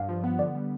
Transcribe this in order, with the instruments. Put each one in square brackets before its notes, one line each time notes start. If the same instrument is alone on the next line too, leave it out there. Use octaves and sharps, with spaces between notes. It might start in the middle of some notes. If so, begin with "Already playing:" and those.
Already playing: [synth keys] G2 [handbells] F5
[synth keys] F3
B3
[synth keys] D3 [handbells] D5
[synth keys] G3